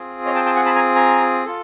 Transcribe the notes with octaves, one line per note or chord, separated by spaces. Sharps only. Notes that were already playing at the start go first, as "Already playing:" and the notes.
Already playing: C4 F4 G#4
C#5 D#5
G5 A5
G5 A5
F#5 G#5
A5 B5
G#5 A#5
G#5 A#5
F4 A4